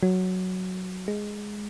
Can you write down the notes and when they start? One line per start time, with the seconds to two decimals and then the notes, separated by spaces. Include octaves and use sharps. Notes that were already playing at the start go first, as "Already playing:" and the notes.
0.03 F#3
1.08 G#3